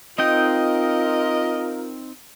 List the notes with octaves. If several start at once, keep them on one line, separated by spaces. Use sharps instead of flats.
C4 D#4 F4 A#4 D#5 G5